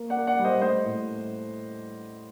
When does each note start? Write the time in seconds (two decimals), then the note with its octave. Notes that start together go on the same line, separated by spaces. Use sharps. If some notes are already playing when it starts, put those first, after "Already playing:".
Already playing: A#3
0.10 D5 F#5
0.16 A#3
0.27 D5 F#5
0.39 G3
0.44 C5 D#5
0.61 A3 C5 D#5
0.84 A2